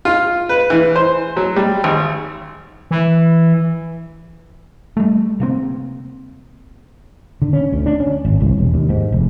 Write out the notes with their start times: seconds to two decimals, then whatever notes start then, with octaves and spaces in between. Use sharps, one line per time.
0.05 F4
0.49 B4
0.70 E3
0.96 C5
1.37 F#3
1.56 G3
1.84 G#1
2.91 E3
4.97 G3 A3
5.40 C3 A#3 C4
7.42 D3
7.53 C#4
7.72 D2
7.86 D4
8.00 C#4
8.25 G#1
8.41 C2
8.58 E1
8.74 D#2
8.89 G#2
9.12 F1